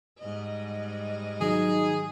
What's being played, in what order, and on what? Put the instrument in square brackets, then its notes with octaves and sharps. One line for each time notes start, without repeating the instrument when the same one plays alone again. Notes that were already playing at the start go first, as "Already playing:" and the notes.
[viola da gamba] G#2 G3 D#5
[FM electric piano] D#3 F#3 [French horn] D#4 [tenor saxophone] G#4